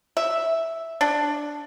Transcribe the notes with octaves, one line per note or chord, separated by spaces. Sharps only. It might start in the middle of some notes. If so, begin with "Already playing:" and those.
E5
D4